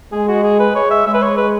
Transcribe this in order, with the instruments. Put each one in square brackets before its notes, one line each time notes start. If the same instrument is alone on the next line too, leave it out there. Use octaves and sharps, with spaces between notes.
[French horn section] G#3 [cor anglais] G#4
[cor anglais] F#4
G#4
B4
[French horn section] G#3 [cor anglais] C#5
[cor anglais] E5
[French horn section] G#3 [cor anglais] E5
[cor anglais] B4
C#5
B4